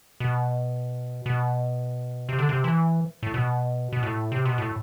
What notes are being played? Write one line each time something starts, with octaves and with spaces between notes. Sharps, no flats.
B2
B2
C3
D3
C3
E3
A2
B2
B2
A2
C3
B2
A2